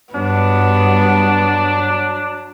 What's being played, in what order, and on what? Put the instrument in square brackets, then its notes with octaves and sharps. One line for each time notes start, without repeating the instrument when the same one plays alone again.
[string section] G2 [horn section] F#3 D4 [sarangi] B3